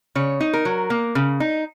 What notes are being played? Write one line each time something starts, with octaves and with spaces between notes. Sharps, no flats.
C#3 C#5
D#4
A#4
F#3
A#3
C#3
D#4